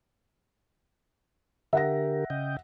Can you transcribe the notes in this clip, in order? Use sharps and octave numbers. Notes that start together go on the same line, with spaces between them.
D3 G4 A#4 E5 F#5 A#6
C#3 D#5 G5